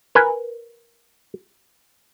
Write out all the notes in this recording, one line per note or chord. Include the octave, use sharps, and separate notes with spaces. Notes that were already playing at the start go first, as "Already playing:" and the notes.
A#4 B4 G#5